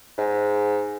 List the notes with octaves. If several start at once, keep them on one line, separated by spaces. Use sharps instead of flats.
G#2